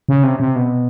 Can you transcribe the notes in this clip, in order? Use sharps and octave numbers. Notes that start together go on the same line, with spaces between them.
C#3
C3
C3
B2